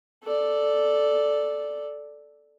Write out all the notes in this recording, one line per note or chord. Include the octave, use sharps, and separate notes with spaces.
A4 D5